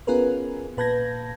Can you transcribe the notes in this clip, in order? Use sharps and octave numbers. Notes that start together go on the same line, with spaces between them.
B3 C#4 F4 G#4 A#4 B4
A#2 B4 A5 G6 G#6 A#6